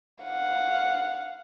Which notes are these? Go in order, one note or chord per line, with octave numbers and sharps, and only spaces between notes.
F5 F#5